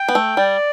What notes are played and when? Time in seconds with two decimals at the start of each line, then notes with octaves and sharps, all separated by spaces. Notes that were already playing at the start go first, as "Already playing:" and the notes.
Already playing: G5
0.08 B3
0.15 A3
0.37 G3 D5